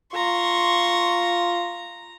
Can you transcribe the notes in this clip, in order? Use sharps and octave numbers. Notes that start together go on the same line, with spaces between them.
F4 A#5 C6 C#6